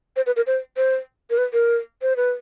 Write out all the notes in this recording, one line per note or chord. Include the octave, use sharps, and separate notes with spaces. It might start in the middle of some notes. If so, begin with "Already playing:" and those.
C5
B4
A#4
C5
C5
A#4
B4
A#4
C5
B4